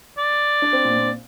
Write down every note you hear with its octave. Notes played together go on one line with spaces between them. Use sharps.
D5
D4
C4
A#2
A#2